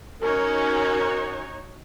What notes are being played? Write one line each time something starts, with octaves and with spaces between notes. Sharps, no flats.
C#4 D#4 F#4 A#4 C#5